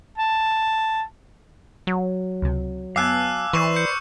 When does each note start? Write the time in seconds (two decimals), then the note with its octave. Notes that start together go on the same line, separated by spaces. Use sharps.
0.18 A5
1.87 F#3
2.42 C#2 C3
2.96 F#2 B3 F5 G#5 A5 D6 E6 F#6
3.53 E3 B4 C5 D5 C#6 E6 E7
3.76 G6 C#7